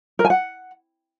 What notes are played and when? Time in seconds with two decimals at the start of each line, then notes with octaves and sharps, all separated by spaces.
0.19 A#4
0.25 G#5
0.30 F#5